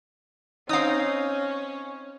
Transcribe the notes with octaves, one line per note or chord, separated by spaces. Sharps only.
C4 C#4 D#4 F5 D#6